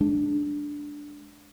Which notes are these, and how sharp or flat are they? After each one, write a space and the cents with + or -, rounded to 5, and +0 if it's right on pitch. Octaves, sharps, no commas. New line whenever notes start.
G#3 +20 D4 +0